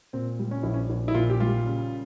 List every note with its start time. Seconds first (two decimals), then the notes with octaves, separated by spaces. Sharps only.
0.13 A#2 C4
0.39 G3
0.51 C#4
0.63 A#1 E4
0.74 C#4
0.90 A#1
1.08 E4
1.14 A#2 F4
1.30 G4
1.40 G3 F4
1.66 C#3